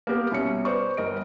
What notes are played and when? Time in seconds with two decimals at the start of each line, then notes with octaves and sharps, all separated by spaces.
0.07 A#3 B3 G4 A#4
0.31 C2 B2 C#4 C#7
0.65 B4 C5 D5 C#6
0.97 G1 A#4 D#5 D7